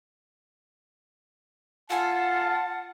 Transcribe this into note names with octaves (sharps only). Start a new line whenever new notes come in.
F4 A4 F#5 G#5 A5